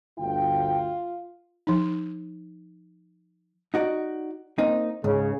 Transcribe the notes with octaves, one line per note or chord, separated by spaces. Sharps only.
G1 D2 F4 G5
F3 D#4
D#4 F#4 D5
A#3 C4 D#4
C#2 G#2 C#3